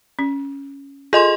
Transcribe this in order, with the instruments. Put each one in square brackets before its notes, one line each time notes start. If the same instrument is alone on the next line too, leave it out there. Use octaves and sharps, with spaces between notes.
[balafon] C#4
[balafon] F4 A4 G#5 [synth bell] G#4 D#5 C6